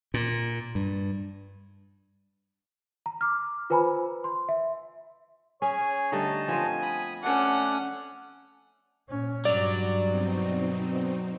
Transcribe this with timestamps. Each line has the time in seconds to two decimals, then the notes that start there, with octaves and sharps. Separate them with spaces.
0.14 A#2
0.75 G2
3.06 A#5
3.21 D6 F6
3.70 F4 B4 C5 G#5 A#5 B5
4.24 C6
4.49 E5
5.62 C#4 G#4 C#5 G#5
6.12 D3 G3 A3 D#4 D#5 A5
6.48 F3 B3 C4 G#5
6.82 B5 D#6
7.23 A3 C#4 D4 F#5
9.08 A#2 C#4
9.45 G2 F#3 D5
10.07 B2 C4 D#4